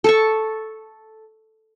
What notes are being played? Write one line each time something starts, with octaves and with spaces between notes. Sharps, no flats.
A4 A5 C#6